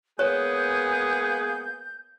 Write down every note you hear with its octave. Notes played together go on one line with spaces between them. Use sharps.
G#3 A#3 B3 G#4 C#5 G6